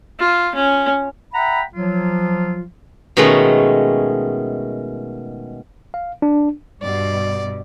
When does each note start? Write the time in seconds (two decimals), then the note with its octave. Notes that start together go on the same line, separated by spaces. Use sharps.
0.19 F4
0.55 C#4
1.34 E5 F#5 G5 A#5 B5
1.74 F3 F#3 F4
3.17 B2 D#3 G#3 A3 C#4
5.94 F5
6.22 D4
6.82 G2 B2 D5